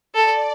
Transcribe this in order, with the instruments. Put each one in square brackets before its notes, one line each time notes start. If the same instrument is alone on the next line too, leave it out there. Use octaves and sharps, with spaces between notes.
[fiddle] A4 [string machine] D5